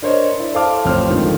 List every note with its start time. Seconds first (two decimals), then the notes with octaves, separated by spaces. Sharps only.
0.02 D4 A#4 C5 C#5 D#5
0.40 E4 D5
0.54 A4 C5 F5 A5 D6 F6
0.85 A1 F2 C4 C5 F6
1.10 G#2 D3 D#3 F3